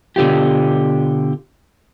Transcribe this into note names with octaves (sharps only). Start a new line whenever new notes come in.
B2 D3 C4 F4 G4